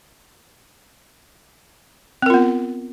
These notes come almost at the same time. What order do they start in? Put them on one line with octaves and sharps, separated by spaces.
C4 A#4 F4 B3